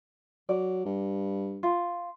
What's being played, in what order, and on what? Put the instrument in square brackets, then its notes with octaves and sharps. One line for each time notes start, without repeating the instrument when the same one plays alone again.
[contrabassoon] F#3 [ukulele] D5
[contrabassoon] G2
[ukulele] F4